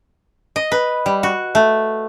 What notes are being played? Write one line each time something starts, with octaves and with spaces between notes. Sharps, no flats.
D#5
B4
G3
F#4
A3